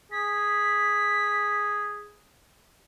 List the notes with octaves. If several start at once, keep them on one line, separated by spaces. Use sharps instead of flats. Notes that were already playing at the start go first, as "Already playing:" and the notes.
G#4 B6